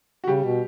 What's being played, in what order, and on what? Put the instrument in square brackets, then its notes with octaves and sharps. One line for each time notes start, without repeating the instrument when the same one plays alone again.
[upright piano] F#4
[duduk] C#3 [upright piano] G3 G4
[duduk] B2